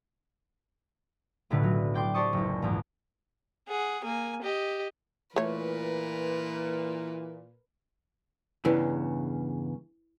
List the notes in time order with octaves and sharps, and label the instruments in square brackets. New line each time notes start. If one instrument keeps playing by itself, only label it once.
[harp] B1 A2 D3 F4 B4
F#3
D5 G5 C6 D6
G4 C5 D5 A5 C#6 D#6
F#1 C#2
A#1 E2 G#2
[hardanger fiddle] G#4 F#5
A#3 G#5
G4 D#5
[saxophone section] A#2 [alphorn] E3 [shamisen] A3 C#5 [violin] A#4 B4
[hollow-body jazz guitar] E2 G2 C#3 [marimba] E4 B4